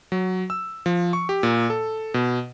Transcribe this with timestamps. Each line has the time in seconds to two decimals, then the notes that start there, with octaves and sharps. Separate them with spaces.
0.12 F#3
0.50 E6
0.86 F3
1.13 C#6
1.29 G4
1.43 A#2
1.70 A4
2.14 B2